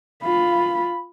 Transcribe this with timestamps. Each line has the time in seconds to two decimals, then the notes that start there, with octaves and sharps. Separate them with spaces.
0.23 F4 B5